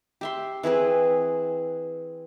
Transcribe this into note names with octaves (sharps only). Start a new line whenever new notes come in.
G4 E5 C6
E3 C4 G#4 B4